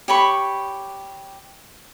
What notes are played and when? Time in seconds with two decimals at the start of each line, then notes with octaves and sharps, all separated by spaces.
0.08 G4 C#5 B5 C#6